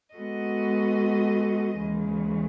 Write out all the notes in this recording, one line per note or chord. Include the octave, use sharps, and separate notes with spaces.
G#3 B3 F#4 A4 D#5
D#2 C#3 E3 G#3